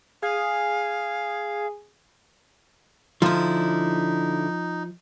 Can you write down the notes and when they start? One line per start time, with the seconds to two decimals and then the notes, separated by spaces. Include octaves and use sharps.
0.22 G#4 F5
3.22 D3 F3 D#4 E4